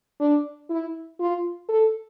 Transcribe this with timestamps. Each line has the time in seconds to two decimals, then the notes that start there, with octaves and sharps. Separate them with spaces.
0.20 D4
0.70 E4
1.20 F4
1.69 A4